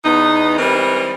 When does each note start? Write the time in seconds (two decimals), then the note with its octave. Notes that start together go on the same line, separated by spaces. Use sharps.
0.04 E2 B3 D#4
0.58 E3 G3 G#3 C4 A#4